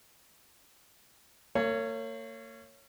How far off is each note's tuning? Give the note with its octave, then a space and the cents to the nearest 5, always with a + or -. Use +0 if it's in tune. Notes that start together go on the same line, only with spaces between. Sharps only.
A#3 -40 C#5 +0